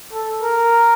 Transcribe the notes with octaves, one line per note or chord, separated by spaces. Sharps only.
A4
A#4